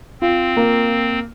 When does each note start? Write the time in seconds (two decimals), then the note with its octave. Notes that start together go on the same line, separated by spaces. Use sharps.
0.21 C4 F4
0.57 A#3